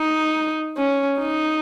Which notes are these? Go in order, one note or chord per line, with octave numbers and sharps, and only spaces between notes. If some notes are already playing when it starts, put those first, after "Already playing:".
Already playing: D#4
C#4
D#4